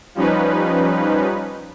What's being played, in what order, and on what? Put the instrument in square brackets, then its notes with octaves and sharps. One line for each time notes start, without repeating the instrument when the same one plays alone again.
[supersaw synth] F3 G3 C#4 D#4 B4